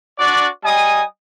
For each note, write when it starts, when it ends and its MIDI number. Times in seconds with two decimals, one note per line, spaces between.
0.19 0.47 62
0.19 0.47 66
0.19 0.47 74
0.63 1.02 55
0.63 1.02 75
0.63 1.02 80
0.63 1.02 87